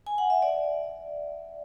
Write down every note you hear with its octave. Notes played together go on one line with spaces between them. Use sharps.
G#5
F#5
E5
D5